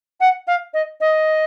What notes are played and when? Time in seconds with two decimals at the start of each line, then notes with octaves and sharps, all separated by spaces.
0.20 F#5
0.47 F5
0.73 D#5
1.00 D#5